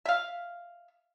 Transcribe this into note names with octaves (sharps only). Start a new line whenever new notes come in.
E5 F5